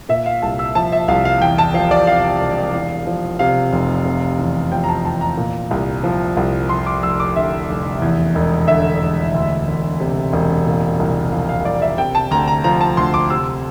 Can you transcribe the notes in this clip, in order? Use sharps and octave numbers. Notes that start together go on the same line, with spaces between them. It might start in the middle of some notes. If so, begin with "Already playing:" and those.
A#2 E5
F5
C2 A5
E6
F3 A5
E5
C2 F5
F5
E2 G5
A5
F3 F5
D5
C3 F5
E1
E2
F3
C3 F5
F1
C3
E2
F3 G5
A#5
A5
E2 A5
A#5
A#2
C2
F3
C2
F2 C6
D6
F1 E6
D6
D3 E5
F1
E2
E1
D3 E5
E1
D2
E1
C3
E1
A#2
C2
F3 F5
F5
C2 D5
E5
C3 G5
A5
D2 A#5
A#5
F3 A#5
A5
D2 C6
D6
C3 E6